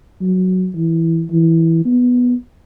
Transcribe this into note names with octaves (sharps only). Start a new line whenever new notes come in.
F#3
E3
E3
B3